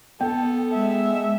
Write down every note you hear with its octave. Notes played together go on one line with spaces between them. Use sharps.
B3 A4 G5
G#3 E5